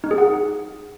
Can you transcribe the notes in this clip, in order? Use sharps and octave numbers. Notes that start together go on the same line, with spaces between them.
D#4
G#4
F#5